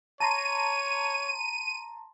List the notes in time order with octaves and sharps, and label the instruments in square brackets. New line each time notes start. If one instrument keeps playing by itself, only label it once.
[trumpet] C#5 [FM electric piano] A5 A#5 C6 [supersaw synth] D#7